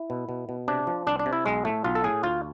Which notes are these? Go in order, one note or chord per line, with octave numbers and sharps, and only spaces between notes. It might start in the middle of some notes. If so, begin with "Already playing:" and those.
Already playing: E4
B2
B2
B2
C3 D4
F3
C2 D4
D4
C3
E4
B1 G#3
A2 A3
B1 F4
A4
A2 G#4
D2 F4